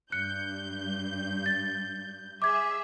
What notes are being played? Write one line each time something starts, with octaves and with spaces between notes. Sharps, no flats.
G2 F#6 G6 C#7
A6
G#4 E5 D6 G#6